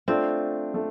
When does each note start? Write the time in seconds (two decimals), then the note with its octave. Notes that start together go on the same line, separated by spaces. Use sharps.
0.08 A3 C4 D4 F4
0.74 A3